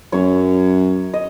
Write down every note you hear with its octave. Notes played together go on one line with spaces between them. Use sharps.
F#2 C#5
D#5